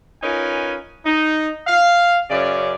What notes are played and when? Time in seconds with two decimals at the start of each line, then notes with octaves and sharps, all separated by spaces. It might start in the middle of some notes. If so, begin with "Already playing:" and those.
0.23 C#4 D#4 F4 A#4 B4 G#5
1.05 D#4
1.67 F5
2.30 F#2 C#3 C#5 D5